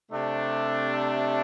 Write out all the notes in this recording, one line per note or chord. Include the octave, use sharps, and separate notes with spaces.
C3 A3 D4